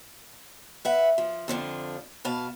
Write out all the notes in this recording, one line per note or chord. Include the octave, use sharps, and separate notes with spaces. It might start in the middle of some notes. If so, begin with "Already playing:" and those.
B4 E5 F#5
F3
F2 D3 F3 D4
B2 B4 F5 A5